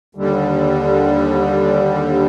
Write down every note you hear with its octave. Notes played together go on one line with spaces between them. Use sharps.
D#2 D3 G3